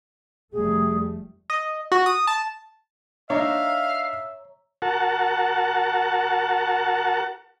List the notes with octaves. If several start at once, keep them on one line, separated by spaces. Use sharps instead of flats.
F1 G3 A3 G#4
D#5
F#4
D#6
A5
D4 D#4 C#5 E5 F5 A#5
F#4 A#4 F#5 A5